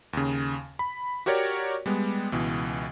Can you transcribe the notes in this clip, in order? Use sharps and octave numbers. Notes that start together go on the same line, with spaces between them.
D#2 C#3
B5
F#4 G4 A#4 C#5 D5
G3 G#3 B3
C#2 B2 E3